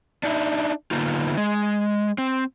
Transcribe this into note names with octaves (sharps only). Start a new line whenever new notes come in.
D4 D#4 E5
D3 A#3 B3 D#4 F4
G#3
C4